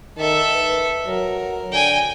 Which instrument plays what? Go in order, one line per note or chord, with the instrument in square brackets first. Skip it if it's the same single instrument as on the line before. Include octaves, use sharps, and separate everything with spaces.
[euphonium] D#3 [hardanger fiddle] A4 E5
[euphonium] B4
[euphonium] F#3 [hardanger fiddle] A#4
[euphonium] D3 [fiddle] G5 G#5